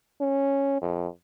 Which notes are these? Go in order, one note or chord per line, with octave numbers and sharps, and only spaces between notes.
C#4
F2